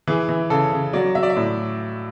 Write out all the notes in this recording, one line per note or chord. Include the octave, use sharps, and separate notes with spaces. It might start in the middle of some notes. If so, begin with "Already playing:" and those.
E3 G#4
E3
C#3 A4
C#3
F#3 D5
F#3 E5
D5
E5
A2